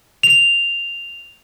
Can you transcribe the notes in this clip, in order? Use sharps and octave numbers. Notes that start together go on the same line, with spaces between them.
F7